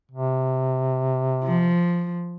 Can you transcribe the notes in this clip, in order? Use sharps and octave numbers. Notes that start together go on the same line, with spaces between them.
C3
F3